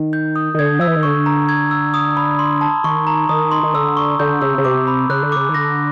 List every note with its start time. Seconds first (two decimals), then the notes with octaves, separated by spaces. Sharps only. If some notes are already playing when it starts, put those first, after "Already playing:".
Already playing: D#3
0.13 G6
0.36 D#6
0.54 D#3
0.59 D3 G#6
0.79 F3 E6
0.87 E3
0.96 D#3
1.03 D3 C#6
1.26 A#5
1.49 G#6
1.71 E6
1.94 D#6
2.17 B5
2.39 C6
2.61 A5
2.84 D#3 C#6
3.07 A#5
3.29 D#3 D#6
3.51 C6
3.63 D#3
3.74 D3 E6
3.97 C#6
4.20 D3 G6
4.42 C#3 E6
4.58 C#3
4.65 C3 D6
4.88 B5
5.09 C#3 F#6
5.23 D3
5.32 C#3 D6
5.49 D#3
5.54 D3 A#6